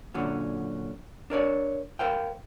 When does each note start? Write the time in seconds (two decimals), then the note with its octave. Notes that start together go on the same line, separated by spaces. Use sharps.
0.14 F#2 A#2 D3 F#3 C#4
1.30 D4 A#4 C#5 D5
1.99 A#4 C5 F5 G5